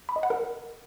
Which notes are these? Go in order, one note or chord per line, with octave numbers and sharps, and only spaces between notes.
B5
D#5
F#5
A#4